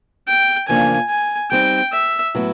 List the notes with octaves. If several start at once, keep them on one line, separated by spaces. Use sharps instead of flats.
G5
E2 C#3 F3 A#3 D4 G#5
G#5
G3 C4 D#4 G5
E5
A2 F#3 B3 E4